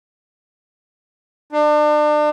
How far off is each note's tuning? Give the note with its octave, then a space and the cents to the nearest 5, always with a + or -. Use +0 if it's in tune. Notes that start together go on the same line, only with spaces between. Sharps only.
D4 +35